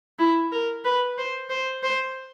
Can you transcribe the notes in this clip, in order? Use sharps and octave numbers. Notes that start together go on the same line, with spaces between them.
E4
A#4
B4
C5
C5
C5